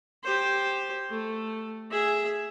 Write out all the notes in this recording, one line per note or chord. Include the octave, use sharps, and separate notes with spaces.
G4 C5
A3
G#4 E5